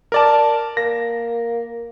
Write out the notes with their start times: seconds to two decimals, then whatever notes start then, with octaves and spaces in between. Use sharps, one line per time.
0.12 A#4 D5 A5
0.77 A#3 A#6